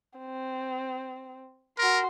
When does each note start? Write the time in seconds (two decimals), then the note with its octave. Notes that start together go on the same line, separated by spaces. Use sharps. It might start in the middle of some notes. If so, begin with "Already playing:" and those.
0.19 C4
1.78 F#4 A#4 C6